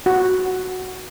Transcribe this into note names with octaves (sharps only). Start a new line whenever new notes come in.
F#4